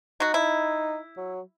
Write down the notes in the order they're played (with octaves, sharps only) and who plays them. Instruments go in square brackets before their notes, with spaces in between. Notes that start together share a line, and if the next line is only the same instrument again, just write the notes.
[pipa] F#3 F#4 [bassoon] D#4
[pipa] E4
[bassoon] F#3